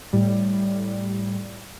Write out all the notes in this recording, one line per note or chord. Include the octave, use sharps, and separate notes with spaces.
A2 G3